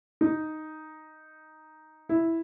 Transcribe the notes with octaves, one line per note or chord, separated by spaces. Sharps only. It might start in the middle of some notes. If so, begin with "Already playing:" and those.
D#4
E4